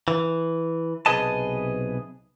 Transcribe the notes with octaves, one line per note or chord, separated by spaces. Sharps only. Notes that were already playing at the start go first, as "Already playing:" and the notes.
E3
B1 C3 G#4 B4 D#5 A5